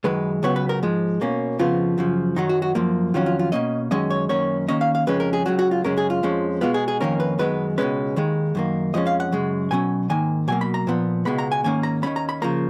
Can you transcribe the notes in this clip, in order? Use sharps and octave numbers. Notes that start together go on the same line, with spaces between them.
F#2 D#3 G#3 B4
C#2 C#3 F#3 B3 C#5
B4
A#4
G#2 F3 G#3
B2 A#3 C#4
F2 C#3 F3 B3 F4
F#2 C#3 F3
F#2 D#3 F#3 D#4
F#4
F#4
F#2 F3 A#3
F2 D#3 F#3 C#4 F4
F4
F4
B2 A#3 C#4 D#5
F#2 D#3 G#3 C#4 D#5
C#5
F#2 D#3 A#3 C#4 C#5
D#2 D#3 A#3 C#4 D#5
F5
F5
F2 C#3 G#3 C#4 B4
A#4
G#4
C#2 C#3 F#3 F#4
F#4
F4
F#2 C#3 G#3 C#4 A#4
G#4
F4
F2 F3 G#3 C#4
B2 G#3 B3 F4
G#4
G#4
F2 D#3 A#3 C#4 A#4
B4
F#2 D#3 G#3 B3 B4
C#2 B2 G#3 C#4 B4
D#2 D#3 G#3
F#2 D#3 A#3
F2 F3 G#3 C#4 D#5
F5
F#5
F#2 C#3 G#3
B2 F#3 C#4 G#5
G#2 D#3 A#3 G#5
B2 F#3 A#3 G#5
B5
A#5
A#2 F3 B3
C#2 B2 G#3 B3 B5
A#5
G#5
G#2 D#3 A#3 C#4 G#5
A#5
D#2 D#3 F#3 C#4 B5
A#5
B5
C#3 F3 A#3 A#5